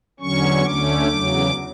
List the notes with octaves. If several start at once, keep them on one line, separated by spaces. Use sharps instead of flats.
E2 D3 F#3 C#4 C#6
D2 D3 A3 C#4 D6
E2 C#3 F#3